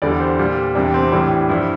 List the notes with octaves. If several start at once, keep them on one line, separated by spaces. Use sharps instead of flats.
E2 D3 G3 D5
C5
A#2 G3
E2 C3 G3 D4
C4
A2 E3 G3 D4
G2 F3 E4